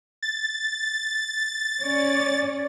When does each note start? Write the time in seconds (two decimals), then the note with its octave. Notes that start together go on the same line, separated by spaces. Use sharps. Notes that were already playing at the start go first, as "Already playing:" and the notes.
0.22 A6
1.82 C#4 C#5 D5